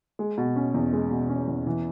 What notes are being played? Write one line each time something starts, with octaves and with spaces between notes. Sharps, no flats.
G#3
B2
C#4
E2
G#3
B2
C#4
E2
E3